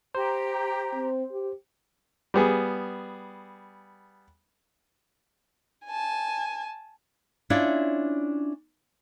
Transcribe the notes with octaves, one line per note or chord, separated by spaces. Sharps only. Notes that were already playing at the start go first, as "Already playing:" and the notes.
G4 C5 A#5
C4
G4
G3 B3 G#4
G#5 A5
C#4 D4 E4 F4 C#5 D5